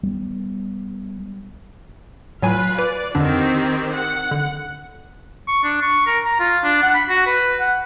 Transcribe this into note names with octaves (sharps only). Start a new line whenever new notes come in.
G3 B3
A2 F#3 F4 B4 G#5
B4 D5
F2 D3 D#3 C4 D4 G4
F#5
D3
C#6
D4
C#6
A#4
A#5
F4
D4
F#5
B5
F#4
B4
F#5